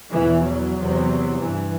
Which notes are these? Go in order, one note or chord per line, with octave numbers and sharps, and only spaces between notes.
E2 B2 E3
F#3
E2 C3
G2 E3